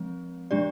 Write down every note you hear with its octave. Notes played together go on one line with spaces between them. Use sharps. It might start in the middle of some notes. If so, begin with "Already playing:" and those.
Already playing: F3 G#3 C4
F3 G#3 D4 G4 D5